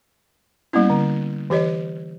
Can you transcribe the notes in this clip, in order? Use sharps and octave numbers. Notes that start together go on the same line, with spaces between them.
G3 A#3 B3 C#4 E4
D3
E3 G4 C#5 D#5